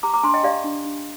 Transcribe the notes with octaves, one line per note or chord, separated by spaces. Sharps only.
G4 A#5 D6
A#5 D6
D4 G#5 C6
D#5 G5
G4 D5 F5
D4
D4